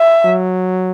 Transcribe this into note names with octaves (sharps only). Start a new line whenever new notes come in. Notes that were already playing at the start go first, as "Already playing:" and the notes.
Already playing: E5
F#3